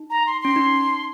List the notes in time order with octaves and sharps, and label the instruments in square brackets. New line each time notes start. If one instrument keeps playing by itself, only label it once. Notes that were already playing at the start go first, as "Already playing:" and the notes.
Already playing: [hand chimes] D#4
[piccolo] A#5
C6
[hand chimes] C#4 [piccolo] C6
[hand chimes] D#4